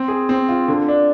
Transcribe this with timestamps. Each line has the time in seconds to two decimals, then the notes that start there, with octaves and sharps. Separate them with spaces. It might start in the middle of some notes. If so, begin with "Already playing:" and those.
Already playing: C4
0.08 G#4
0.29 C4
0.49 F4
0.68 D3
0.88 D4